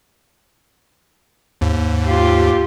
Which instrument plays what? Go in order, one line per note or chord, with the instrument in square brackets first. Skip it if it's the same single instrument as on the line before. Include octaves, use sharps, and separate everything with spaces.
[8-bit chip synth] D#2 G#2
[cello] F4 G4